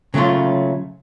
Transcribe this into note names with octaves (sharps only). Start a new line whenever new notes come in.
C#3 F#3 A3 C#4 F4